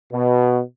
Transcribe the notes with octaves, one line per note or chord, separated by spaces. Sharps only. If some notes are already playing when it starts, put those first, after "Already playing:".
B2